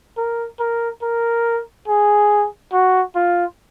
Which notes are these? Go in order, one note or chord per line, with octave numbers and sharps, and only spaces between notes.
A#4
A#4
A#4
G#4
F#4
F4